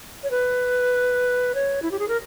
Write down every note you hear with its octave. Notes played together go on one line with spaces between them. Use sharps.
C#5
B4
C#5
E4
G4
G#4
A#4